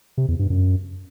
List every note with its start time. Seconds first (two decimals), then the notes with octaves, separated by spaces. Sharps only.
0.18 C3
0.28 E2
0.39 G2
0.50 F#2